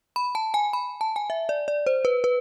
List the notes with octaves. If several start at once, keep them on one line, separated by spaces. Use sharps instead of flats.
B5
A5
G#5
B5
A5
G#5
E5
D5
D5
C5
B4
B4